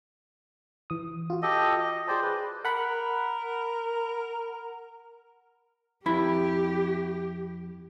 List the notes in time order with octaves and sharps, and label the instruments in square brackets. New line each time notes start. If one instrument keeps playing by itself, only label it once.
[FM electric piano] E3 D#6
F4 F#4
[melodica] G4 A4 D#5
D#5
[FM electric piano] G#4 G5 A5 [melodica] C5 D5
[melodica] B4
[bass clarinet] A#4 [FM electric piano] F#5 B5
[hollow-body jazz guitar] F2 E4 B5 [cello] G4